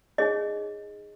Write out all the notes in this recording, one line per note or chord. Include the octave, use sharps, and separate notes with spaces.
D#4 G#4 C#5 D#5